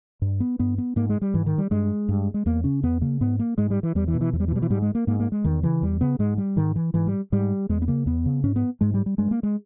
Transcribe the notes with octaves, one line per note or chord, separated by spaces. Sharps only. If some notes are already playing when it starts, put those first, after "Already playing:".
G2
B3
G2 B3
B3
G#2 A#3
G#3
G3
G#2 E3
D#3
G3
G2 G#3
G2
G#3
E2 A#3
C#3 C#4
E2 B3
C#3 A#3
G#2 B3
A#3
G#2 G#3
G3
E3
E2 G3
E3
B2
E3
E2 E3
G3
E3
B2 G3
E3
G#2 G3
G#3
A#3
G#2 A#3
A#3
G#3
E2 D#3
C#3 E3
E2 G3
C#3 B3
G#2 G#3
G3
G#2 D#3
E3
G#2 E3
G3
G#2 G3
E2 G#3
B3
C#3 A#3
E2 B3
C#3
G#2 C#4
B3
G#2 G#3
G3
G3
G2 G#3
A#3
G#3